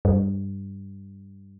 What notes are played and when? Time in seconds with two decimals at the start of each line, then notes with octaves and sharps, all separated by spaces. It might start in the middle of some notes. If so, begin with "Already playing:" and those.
0.05 G2